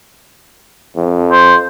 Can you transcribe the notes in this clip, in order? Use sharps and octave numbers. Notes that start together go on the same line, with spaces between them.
F2
C5